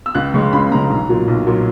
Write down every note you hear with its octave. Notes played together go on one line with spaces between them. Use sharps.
E6
C#2 F#6
C#3 G#3 C#6
C#2 B5
C#3 G#3 A#5
B1
A#2 F#3
B1
A#2 F#3